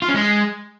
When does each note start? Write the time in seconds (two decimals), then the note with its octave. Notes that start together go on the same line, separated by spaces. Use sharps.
0.02 F4
0.08 C#4
0.15 G#3